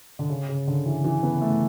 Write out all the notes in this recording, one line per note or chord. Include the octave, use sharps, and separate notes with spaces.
D3
C#3
C#3
D3
E3
E3
B3
A3